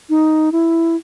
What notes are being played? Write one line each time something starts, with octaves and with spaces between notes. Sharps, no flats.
D#4
E4